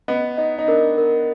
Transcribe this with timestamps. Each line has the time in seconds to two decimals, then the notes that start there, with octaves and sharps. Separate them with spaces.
0.08 B3 D#5
0.37 D#4 D#5
0.58 D#4
0.68 D4 A#4
0.98 A#4